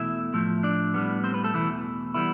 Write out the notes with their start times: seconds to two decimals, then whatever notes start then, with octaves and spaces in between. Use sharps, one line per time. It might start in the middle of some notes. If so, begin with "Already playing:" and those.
Already playing: E2 B2 A3 E4 E5
0.33 A2 F3 A3
0.63 D4 D5
0.94 A2 G3 B3
1.24 C4 C5
1.34 B3 B4
1.44 A3 A4
1.54 E2 B2 E3 A3 E4
2.14 E3 G3 B3 E4